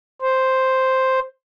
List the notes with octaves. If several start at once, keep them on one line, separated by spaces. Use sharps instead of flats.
C5